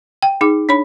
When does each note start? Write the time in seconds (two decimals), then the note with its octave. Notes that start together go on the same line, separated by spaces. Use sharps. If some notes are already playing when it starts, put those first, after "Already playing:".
0.22 G5
0.41 D#4 G#4 D6
0.69 D4 C#5 B5